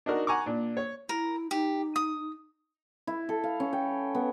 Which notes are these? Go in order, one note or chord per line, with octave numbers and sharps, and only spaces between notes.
D4 D#4 F#4 A#4
F#5 G#5 A#5 C#6 D6
A#2 D4
C#5
E4 A#4
D#4 G4
D#6
E4
A4
F5
C#4
G5
B3